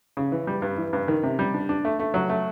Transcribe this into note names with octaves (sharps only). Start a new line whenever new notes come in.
C#3
E3
G3
G2
E3
G2
D#3
C3
G3
D4
D4
A3
A3
F#3
A3